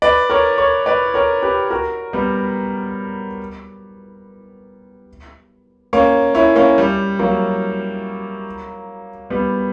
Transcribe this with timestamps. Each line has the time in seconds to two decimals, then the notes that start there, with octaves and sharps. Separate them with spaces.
0.02 B4 D5
0.30 A#4 C#5
0.58 A#4 C#5
0.86 B4 D5
1.14 A#4 C#5
1.42 G4 B4
1.70 F#4 A#4
2.13 G3 B3
5.93 A#3 C#4
6.35 C#4 E4
6.56 A#3 C#4
6.78 G3
7.19 F#3 A#3
9.30 G3 B3